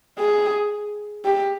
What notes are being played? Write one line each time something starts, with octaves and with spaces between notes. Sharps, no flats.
G#4
G4